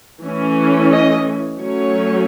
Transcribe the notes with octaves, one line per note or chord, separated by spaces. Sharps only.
E3 A3 C#4
D#5
F#3 A3 C#4 C#5